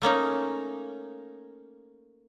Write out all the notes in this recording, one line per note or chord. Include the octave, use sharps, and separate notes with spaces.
A3 A#3 C#4 D#4